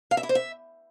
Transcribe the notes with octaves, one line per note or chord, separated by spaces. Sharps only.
F5
E5
E4
C5
E5